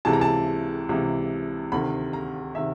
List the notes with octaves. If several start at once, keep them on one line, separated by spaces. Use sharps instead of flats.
C#2 C3 E3 A5
A#5
A5
C#2 C3 E3
D2 C3 D#3 B5
A#5
C3 D#3 E5